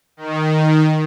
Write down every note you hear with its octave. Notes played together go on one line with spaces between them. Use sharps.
D#3